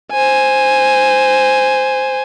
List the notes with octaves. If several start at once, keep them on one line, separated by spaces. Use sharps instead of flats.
C5 G#5